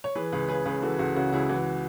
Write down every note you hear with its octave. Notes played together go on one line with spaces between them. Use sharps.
C#5
E3 G#4 B4
C#2 G#4 B4
C#3 G#4 B4
C#2 G#4 B4
E3 F#4 A4
C#2 F#4
C#3 F#4
C#2 E4 G#4
E3 F#4